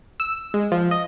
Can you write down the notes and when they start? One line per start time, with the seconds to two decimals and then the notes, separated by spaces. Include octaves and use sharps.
0.20 E6
0.54 G#3
0.72 F3
0.91 D#5